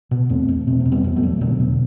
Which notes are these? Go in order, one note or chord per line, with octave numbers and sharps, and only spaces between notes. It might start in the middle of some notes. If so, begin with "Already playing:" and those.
B2
E2 A3 C4
E2
B2 A3 C4
C4
B2
G3 B3
E2
F#3 A3
E2
B2 D3 F#3
B2